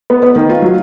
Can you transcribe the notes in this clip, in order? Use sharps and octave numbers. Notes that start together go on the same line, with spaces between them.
B3
B3
D#3
F4
F#3